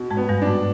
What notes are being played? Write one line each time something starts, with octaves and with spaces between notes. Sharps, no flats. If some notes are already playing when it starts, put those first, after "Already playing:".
Already playing: B2
G#2 G#3
B3
G2 G3
D4
G#2 G#3